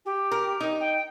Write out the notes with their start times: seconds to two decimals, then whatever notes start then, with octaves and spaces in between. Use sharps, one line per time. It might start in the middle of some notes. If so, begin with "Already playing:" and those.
0.05 G4
0.31 A#4
0.60 D#4
0.80 G5